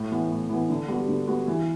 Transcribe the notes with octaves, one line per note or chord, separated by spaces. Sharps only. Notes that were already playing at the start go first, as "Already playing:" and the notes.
Already playing: A2
E3 B3
A2
E3 B3
D3
G3 B3 F#4
D3
G3 B3 F#4
E3